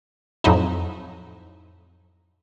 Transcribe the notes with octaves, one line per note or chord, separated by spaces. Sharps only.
F2 A2 F#3 D#4 E4